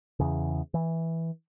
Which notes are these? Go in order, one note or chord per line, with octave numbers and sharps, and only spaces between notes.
E2 C#3
E3